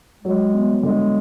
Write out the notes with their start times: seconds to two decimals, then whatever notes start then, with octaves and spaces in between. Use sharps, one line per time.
0.24 F#3 G#3
0.54 B3
0.83 D3 G#3